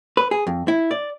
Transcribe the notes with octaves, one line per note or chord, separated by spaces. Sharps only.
B4
G#4
F2
E4
D5